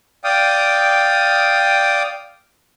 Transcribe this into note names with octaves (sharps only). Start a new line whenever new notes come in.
D5 F5 G5 D#6